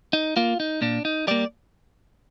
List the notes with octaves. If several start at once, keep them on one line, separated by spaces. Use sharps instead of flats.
D#4
A#3 F4
D#4
A#2 D4
D#4
G3 A#3 D5